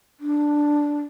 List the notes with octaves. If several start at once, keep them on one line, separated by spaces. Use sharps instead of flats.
D4